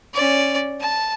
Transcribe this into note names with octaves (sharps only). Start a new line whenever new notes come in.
C#4 D5
A5